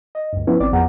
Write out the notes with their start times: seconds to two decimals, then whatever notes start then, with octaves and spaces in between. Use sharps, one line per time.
0.15 D#5
0.33 D2 G2
0.47 F3 B3 C#4 E4 B4
0.60 G#1 C4 D5 D6
0.73 E2 F3 B3 G#4 F#5 A#5